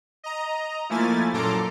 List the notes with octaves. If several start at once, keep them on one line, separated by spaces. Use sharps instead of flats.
D#5 A#5
F3 A3 A#3 E4 G#5 A6
F#2 A#2 A4 A#5 C6 D6